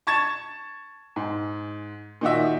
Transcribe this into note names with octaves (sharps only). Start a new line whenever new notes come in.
A5 C#6 G#6 A6 E7
G#2
A#2 D#3 D#4 F#4 E5